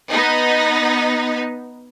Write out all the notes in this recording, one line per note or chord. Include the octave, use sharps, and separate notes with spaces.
B3 D#4